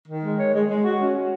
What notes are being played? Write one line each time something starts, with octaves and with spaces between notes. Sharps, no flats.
D#3
G#3
C#5
G#3
G#3
F#4
C#4
F#4